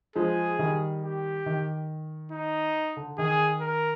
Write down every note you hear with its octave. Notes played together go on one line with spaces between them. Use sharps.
F3 G#3 G#4
D#3 G3
G4
D#3
D#4
D3
D#3 G#4
A#4